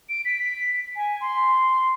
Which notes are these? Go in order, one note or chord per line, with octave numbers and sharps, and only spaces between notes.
D7
B6
G#5
C6